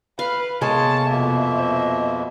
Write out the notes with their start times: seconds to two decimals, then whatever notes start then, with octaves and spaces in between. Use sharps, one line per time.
0.19 B4 F5
0.62 C3 G#3 A#3 B3 A4 C#5 A5
1.10 F2 B2 A#3 E5
1.58 C5 D#5